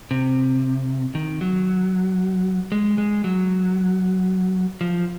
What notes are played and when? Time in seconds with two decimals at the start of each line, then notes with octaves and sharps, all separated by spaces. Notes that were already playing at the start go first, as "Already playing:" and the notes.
0.11 C3
1.15 D#3
1.41 F#3
2.72 G#3
2.98 G#3
3.24 F#3
4.81 F3